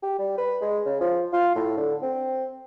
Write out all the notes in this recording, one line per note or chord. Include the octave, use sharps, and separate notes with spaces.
G4
G3
B4
G#3
C#3
F3
F4
A2
D3
C4